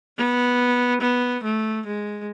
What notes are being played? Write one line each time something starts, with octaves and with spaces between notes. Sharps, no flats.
B3
B3
A3
G#3